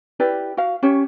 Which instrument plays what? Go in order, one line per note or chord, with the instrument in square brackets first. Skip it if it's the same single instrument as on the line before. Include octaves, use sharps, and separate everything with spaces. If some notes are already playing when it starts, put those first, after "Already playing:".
[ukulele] E4 G4 B4 D5
F#4 F5
C#4 G4 C#5